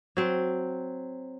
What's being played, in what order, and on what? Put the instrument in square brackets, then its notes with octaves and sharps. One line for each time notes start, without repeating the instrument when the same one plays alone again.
[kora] F#3 C4